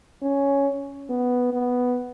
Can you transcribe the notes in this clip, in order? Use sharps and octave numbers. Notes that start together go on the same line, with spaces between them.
C#4
B3
B3